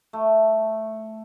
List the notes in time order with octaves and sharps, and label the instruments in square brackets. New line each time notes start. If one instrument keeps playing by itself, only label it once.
[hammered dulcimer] A3